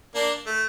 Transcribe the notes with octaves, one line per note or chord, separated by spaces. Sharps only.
A#3 D4
A3